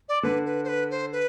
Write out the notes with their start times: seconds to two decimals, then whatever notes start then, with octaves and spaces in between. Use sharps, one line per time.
0.09 D5
0.23 D3 B4
0.46 B4
0.64 C5
0.68 B4
0.90 C5
1.12 B4